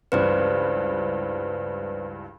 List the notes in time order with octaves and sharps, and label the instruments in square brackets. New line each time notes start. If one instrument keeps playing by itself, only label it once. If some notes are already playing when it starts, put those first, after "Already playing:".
[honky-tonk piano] C#2 G2 E3 [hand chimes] B4 C5 D5